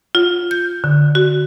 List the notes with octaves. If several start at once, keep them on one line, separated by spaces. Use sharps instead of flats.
F4
G6
D3
F#4